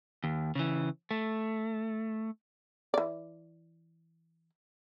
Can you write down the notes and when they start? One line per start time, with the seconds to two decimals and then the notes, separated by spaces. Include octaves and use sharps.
0.24 D#2
0.55 C#3 E3
1.11 A3
2.94 E3 D5